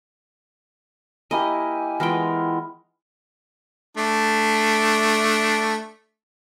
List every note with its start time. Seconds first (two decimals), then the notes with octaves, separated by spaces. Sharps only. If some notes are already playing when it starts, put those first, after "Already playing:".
1.31 A#3 E4 G4 A#4 D#5 G#5
2.00 E3 G#3 B3 F4 A#4 G5
3.97 A3 D4